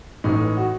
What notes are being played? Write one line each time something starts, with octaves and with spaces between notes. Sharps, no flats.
A1 A2 E3 D#4
F#4